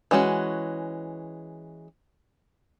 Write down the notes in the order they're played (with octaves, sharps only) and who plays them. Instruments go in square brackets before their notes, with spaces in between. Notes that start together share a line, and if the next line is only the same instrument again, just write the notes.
[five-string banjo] E3 G#3 C#4 F#4